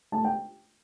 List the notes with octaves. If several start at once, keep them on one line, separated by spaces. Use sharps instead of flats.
A3 A5
G5